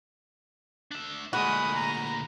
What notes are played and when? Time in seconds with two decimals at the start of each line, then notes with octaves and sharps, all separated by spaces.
0.91 D4 E5
1.33 D2 A#2 G#3 F#4 B5 D#6
1.74 A#5